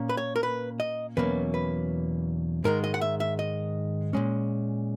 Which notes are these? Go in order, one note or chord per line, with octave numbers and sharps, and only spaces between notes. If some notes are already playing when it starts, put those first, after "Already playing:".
Already playing: A#2 A#3 C#4
B4
C#5
A#4
B4
D#5
E2 B2 F#3 A#3 C#4 B4
B4
G#2 D#3 G#3 A#4
D#5
F#5
E5
E5
D#5
A#2 G#3 C#4